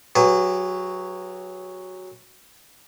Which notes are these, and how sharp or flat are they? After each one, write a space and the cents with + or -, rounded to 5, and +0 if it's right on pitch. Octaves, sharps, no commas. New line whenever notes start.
F#3 +0 G#4 -40 B4 +0